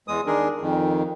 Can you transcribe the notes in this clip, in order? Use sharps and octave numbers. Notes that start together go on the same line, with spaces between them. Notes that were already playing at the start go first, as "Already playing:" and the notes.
E2 G#3 D#6
D#3 D4 G#4 A#4
F2 D#3